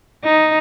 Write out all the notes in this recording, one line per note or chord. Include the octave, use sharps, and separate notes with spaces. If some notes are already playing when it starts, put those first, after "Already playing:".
D#4